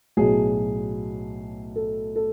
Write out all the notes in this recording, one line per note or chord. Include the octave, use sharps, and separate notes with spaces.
B1 A2 F#3 G#4
A4
A4